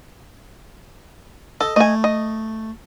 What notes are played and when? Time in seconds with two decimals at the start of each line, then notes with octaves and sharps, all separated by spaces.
1.61 A4 D#5
1.76 A3 D#5 G#5
2.04 D#5